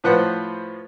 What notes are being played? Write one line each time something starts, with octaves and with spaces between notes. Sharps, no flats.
A2 F3 B4 C5 F#5